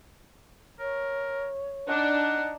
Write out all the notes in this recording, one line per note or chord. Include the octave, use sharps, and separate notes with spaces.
A#4 C#5
D4 D#4 F#5